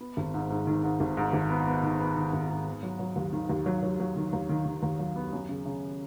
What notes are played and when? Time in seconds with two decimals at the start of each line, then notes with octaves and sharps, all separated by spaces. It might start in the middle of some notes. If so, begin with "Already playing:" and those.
0.01 B3
0.17 G#1
0.34 G#2
0.50 G#2
0.67 D#3
0.83 G#2
1.00 G#1
1.17 G#2
1.33 G#1
1.50 B3
1.67 B3
1.83 D#3
2.00 B3
2.16 D#3
2.33 G#1
2.50 G#2
2.67 B3
2.83 F#3
2.99 F#3
3.16 D#2
3.33 D#3
3.49 D#2
3.66 F#3
3.83 F#3
4.00 F#3
4.16 D#3
4.33 D#2
4.49 D#3
4.66 D#3
4.83 D#2
4.99 F#3
5.16 B3
5.33 F#2
5.49 C#3
5.65 C#3